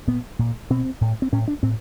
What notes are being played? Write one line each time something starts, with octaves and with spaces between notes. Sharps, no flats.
A#2 B3
A#2
B2 C4
A2
C4
A2 C#4
D4
A2 C4